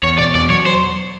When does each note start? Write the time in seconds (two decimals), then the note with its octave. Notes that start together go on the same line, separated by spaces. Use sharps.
0.03 E2 C#5
0.18 B2 D5
0.35 E2 D5
0.50 F#3 C#5
0.66 C5